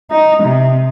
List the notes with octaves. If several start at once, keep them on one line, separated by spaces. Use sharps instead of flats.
D#4
C3